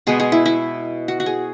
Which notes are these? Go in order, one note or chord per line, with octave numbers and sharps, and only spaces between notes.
B2 G#3 B3 G#4
G#4
E4
E4
F#4
F#4
G#4